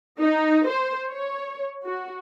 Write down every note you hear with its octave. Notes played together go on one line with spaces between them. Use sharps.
D#4
C5
C#5
F#4